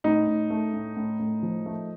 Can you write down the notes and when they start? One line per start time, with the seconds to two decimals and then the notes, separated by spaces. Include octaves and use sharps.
0.04 A2 D#4
0.27 A2
0.50 A3
0.73 A2
0.97 A2
1.19 A2
1.43 F3
1.66 A3